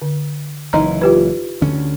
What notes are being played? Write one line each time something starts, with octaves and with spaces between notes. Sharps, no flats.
D3
F#1 E3 D#4 D#5 A#5
F4 G4 B4
D2 D3 C#4